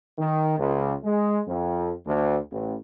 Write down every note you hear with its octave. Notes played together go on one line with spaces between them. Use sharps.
D#3
C#2
G#3
F2
D2
A1